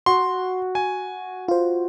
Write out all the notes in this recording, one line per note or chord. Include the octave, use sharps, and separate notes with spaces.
F#4 C6
G#5
F4 C5